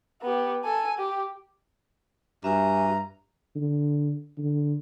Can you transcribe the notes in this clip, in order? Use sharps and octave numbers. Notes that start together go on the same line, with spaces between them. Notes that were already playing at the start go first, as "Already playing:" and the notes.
B3 G4
A4 G#5
G4
G2 F#4 G4 E5 G#5 A#5
D3
D3